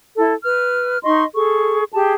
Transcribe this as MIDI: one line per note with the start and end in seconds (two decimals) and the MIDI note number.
0.16 0.34 64
0.16 0.34 69
0.44 0.99 71
0.44 0.99 89
1.04 1.24 63
1.04 1.24 75
1.04 1.24 84
1.04 1.24 85
1.34 1.84 68
1.34 1.84 69
1.34 1.84 85
1.93 2.14 67
1.93 2.14 68
1.93 2.14 81